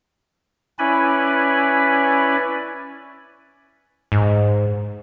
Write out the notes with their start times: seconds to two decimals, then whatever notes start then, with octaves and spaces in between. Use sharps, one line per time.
0.79 C#4 E4 B4 D5 G#5 B5
4.12 G#2